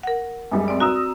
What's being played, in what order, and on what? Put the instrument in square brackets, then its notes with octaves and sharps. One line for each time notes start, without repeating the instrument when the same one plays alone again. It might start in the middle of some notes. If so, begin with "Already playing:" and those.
[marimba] A#4 F#5
[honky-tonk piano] F#2 G3 G#3
[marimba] C4 D5
[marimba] F#4 [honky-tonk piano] A#5 D#6 E6